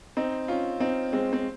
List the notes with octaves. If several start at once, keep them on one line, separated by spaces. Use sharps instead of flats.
C4 D#4
C#4 F4
C4 D#4
G#3 C4
C4